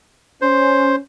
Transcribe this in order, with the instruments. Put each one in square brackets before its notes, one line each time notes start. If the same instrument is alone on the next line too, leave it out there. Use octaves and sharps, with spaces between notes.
[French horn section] C#4 [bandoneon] C5